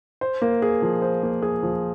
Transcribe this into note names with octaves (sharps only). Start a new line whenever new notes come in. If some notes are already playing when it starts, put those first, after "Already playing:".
C5
A#3
G#4
F3
C5
A#3
G#4
F3